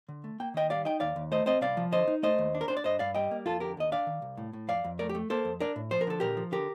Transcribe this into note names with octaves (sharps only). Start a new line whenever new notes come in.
D3
A3
A#3 G5
D#3 D#5 G5
G3 D5 F5
D#4 D#5 G5
D#2 D5 F5
D#2
A3 C5 D#5
C4 C5 D#5
C2 D5 F5
F3
D3 C5 D#5
D#4
A3 C5 D#5
D#2
D4
A#4
D4 C5
D5
G2 C5 D#5
G2 D5 F5
G3 D#5 G5
A#3
F2 F4 A4
D3 G4 A#4
D#2 D#5
D4 D5 F5
D#3
C2
A2
A2
F2 D5 F5
F2
A3 A#4 D5
G4
A3
A#3 A4 C5
F2
D4 A#4 D5
A2
F3 C5
A#4
D3 A4
A#2 G4 A#4
F3
D3 G4 A#4